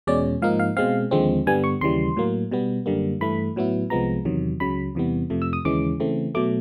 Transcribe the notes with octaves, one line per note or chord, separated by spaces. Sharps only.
E2 B2 G#3 C#4 D5
G#2 F3 A#3 D#4 F5
F5
B2 G#3 C4 F5
D#2 D3 F3 G#3 C4
G2 D3 G3 B3 G#5
C#6
D#2 C#3 E3 G3 C6
A2 F#3 A#3
B2 G3 B3
F#2 D3 G3 A#3
G2 E3 A3 B5
A2 F#3 B3 E4
C2 C3 F3 G#3 B3 A#5
E2 C3 D#3 F#3
C#2 C#3 F#3 B5
E2 C3 E3 G3 B3
F2 C3 F3 A3
E6
D#6
D#2 C#3 E3 G#3 C#4 D6
C#3 E3 A3 C4
B2 F#3 A3 D6